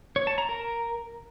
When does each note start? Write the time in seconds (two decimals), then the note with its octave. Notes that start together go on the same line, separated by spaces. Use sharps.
0.16 C#5
0.27 A5
0.38 A#5
0.49 A#4